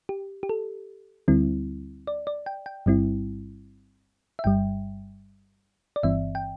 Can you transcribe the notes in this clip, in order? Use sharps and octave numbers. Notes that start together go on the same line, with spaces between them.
G4
G4
A4
D2 D3 G3 C4 E4
D5
D5
G5
G5
G1 G2 G3 C4 E4
E5
G1 G2 G3 G5
D5
G1 G2 E3 C4 E5
G5